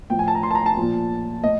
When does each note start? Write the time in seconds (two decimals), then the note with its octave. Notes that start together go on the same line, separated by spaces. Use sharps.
0.10 A2 F3 G5
0.19 G#5
0.28 A5
0.35 A#5
0.43 C6
0.51 A5
0.55 A#5
0.66 A5
0.77 A#2 F3
1.44 A2 D#5